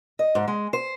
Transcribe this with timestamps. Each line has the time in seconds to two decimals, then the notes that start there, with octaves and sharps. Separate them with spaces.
0.19 D#5
0.35 G#2
0.48 G#3
0.73 C5